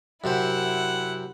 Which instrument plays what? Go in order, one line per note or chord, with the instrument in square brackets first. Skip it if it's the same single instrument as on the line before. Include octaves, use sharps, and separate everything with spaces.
[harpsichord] F#2 C3 C5 [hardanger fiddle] E4 F#5